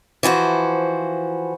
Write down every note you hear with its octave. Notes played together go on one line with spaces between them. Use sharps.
E3 F3 F#4 C5